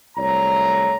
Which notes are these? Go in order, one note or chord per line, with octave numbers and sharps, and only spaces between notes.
C2 A3 C#5 A#5